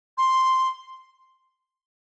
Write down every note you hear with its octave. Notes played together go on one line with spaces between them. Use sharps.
C6